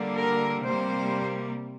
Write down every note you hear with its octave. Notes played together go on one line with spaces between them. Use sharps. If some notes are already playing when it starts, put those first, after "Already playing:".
Already playing: D3 G3 A#3
A#4
C3 G3 A#3 C5